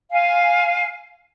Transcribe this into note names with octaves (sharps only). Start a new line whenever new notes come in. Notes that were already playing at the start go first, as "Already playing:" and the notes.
F5 G#5